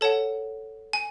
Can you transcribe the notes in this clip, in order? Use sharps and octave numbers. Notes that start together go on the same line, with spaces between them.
A4 C#5 F#5 A5
G#5